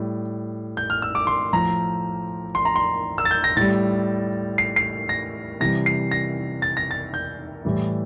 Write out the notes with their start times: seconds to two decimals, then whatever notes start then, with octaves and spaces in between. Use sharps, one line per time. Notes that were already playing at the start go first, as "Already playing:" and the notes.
Already playing: A2 G3
0.77 G6
0.90 F6
1.02 E6
1.15 D6
1.27 C6
1.53 A2 F3 A#5
2.55 C6
2.65 A#5
2.76 C6
3.18 E6
3.25 A6
3.31 G6
3.44 A#6
3.57 A2 G3 A6
4.58 C7
4.76 C7
5.09 A#6
5.60 C3 E3 G3 A#6
5.86 C7
6.11 A#6
6.62 A6
6.77 A#6
6.91 A6
7.14 G6
7.65 A2 E3 G3